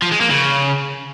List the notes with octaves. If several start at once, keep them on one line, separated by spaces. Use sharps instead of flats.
F3
G#3
A#3
C#3